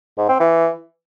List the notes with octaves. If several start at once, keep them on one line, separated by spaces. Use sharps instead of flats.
G#2
C4
E3